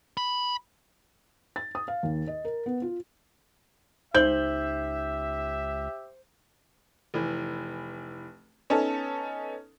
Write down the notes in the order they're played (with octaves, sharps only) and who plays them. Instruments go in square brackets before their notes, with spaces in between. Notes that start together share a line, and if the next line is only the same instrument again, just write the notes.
[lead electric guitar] B5
[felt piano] A6
D#6
F5
D#2
D#5
A#4
B3
F4
[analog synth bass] C#2 [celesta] D#4 F#7 [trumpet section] G4 E5 [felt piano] C5 G6
[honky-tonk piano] F1 E3
B3 C#4 D#4 A4 A5